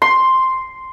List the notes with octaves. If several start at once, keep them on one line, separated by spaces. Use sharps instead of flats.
C6